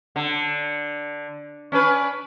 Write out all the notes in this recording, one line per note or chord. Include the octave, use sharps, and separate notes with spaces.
D3
C#4 D4 B4